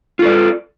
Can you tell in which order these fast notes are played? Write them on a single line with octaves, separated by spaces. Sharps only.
F4 A4 D5